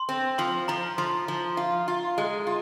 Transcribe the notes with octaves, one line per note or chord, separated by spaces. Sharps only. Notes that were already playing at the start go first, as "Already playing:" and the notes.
Already playing: C6
C4
F3 C6
F3 A#5
F3 C6
F3
F4
F4
G#3
F4